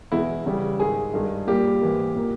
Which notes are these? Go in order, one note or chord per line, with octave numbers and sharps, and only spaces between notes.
E2 B2 G#3 E4
E2 C#3 G3
G#2 D#3 G#3 G#4
G2 D#3 G#3
A#2 G3 A#3 G4
G#2 E3 A#3
A#2 A#3